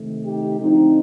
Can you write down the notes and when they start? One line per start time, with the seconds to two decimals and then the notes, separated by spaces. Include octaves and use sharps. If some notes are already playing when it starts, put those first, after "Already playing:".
Already playing: C3 D#3 A3
0.24 D#4 G4
0.59 D3 F3 A3 C4 D#4